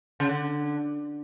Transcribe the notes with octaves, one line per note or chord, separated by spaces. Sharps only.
C#3
D3